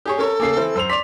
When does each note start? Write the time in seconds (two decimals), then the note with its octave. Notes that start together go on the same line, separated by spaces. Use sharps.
0.06 G4 G#4 C#5
0.18 C#4 A4 A#4 C#5
0.40 C#3 A#3 G#4 C7
0.57 E3 C4
0.75 F#2 C5 E6 F7
0.89 D5 C6 B6 F7